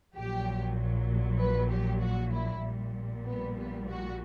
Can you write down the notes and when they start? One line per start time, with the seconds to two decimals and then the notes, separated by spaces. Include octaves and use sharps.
0.15 A#1 A#2 F#3 G4
1.40 B4
1.70 G4
2.01 F#4
2.33 E4
2.63 A#1 A#2 G3
3.25 B3
3.57 B3
3.88 F#4